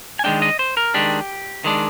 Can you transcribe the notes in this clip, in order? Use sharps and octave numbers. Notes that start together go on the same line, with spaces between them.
G#5
D#3 G#3 D4 G5
D#5
C5
A#4
D#3 G#3 D4 G4
D#3 G#3 D4